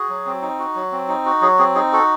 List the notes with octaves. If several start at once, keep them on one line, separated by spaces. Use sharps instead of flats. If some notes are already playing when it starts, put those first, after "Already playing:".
Already playing: F#4 G#4
F#3
C4
D#4
F#4
F#3
C4
D#4
F#4
F#3 G#4
C4 G#4
D#4 G#4
F#4 A4